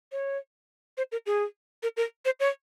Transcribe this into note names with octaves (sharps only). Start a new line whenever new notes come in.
C#5
C5
A#4
G#4
A#4
A#4
C5
C#5